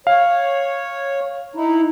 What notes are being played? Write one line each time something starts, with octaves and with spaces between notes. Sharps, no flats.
C#5 F5
D#4 E4